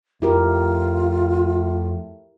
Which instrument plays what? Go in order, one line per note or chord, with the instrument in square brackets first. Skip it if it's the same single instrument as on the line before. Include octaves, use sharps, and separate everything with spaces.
[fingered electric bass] F2 [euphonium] A2 [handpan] E4 G4 A#4 [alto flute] F4